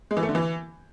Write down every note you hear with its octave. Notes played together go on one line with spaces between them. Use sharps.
G#3
E3
A3
D3
E3